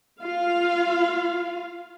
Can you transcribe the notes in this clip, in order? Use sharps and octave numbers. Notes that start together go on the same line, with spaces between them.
F4 F5